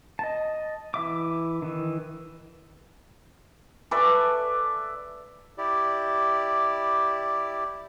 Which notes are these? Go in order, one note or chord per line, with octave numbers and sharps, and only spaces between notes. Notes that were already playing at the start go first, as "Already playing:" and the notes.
D#5 A5
E3 E5 D6
D#3 E3
A4 B4 D5 E5
E4 G4 D5